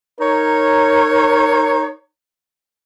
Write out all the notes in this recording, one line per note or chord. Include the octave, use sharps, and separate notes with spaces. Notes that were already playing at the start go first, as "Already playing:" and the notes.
D#4 A#4 C#5